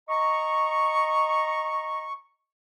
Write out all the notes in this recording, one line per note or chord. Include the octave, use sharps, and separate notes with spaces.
D#5 A#5 C#6